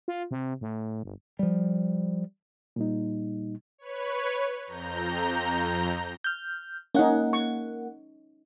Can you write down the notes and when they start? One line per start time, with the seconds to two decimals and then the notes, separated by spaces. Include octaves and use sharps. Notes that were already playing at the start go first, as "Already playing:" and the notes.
0.08 F4
0.31 C3
0.61 A2
1.03 G1
1.39 F3 G3
2.76 A#2 G3 D#4
3.78 B4 C#5
4.65 F2 A#5 G6
6.24 F6 G6
6.95 A#3 C#4 D#4 F#5
7.33 C#6